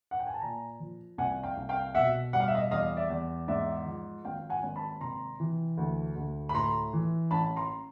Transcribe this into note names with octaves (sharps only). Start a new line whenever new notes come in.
F#5
G5
G#5
A5
A#2 G#5 A#5
F3
C2 F#5 G#5
F5 G5
C2
F5 G5
B2 E5 F#5
G3 F#5
F5
E5
D#5 F5
E2 D#5 F5
D5 E5
E2
G#2 D5 E5
F3
G#1 F5 G5
F#5 G#5
G#1
A5 B5
C3 A#5 C6
E3
D2
D2
B5
A2 A#5 C6
E3
A1 A5 B5
A#5 C6